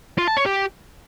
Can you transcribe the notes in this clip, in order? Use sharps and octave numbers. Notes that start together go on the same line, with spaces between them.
F4
A5
C#5
G4